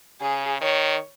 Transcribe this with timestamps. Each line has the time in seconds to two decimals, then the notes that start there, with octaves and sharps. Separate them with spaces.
0.21 C#3 G#4
0.61 D#3 C#5